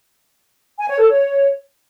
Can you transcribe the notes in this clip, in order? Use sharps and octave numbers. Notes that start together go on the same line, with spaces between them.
G#5
C#5
A4
C#5